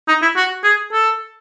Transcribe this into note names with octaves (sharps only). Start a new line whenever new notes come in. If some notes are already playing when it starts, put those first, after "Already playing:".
D#4
E4
F#4
G#4
A4